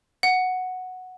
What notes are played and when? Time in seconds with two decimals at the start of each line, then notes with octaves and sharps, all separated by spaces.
0.23 F#5